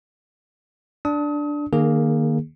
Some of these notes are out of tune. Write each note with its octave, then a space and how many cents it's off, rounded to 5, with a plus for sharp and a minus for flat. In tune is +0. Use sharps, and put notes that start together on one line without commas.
D4 +0 D#6 +35
D#3 -30 A#3 +0 G#4 +0